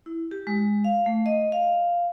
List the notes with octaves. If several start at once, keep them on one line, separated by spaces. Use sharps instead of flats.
E4
G4
G#3
F5
A3
D#5
F5